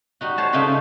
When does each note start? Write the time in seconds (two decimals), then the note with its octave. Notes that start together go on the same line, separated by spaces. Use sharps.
0.21 G3 D#4 F#4
0.38 C5 C#5 A5
0.53 C#3 A3 D#4 F4 B4 C5